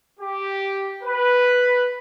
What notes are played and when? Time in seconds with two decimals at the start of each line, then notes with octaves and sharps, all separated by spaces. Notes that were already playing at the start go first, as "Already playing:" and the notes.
0.20 G4
1.04 B4